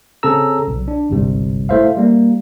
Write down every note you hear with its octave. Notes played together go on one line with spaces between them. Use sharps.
C#3 C4 G#4 A4 A#5 E6
B1
D4
G1 C#2 G#2 C3 G3
A3 E4 C5 E5 F5
G3 A#3